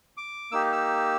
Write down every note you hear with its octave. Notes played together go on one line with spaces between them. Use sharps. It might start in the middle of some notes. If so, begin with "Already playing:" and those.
D6
A#3 D#4 G4 E6
E6